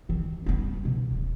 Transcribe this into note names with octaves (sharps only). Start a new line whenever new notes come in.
D#3 C4
G3 B3
B2
D1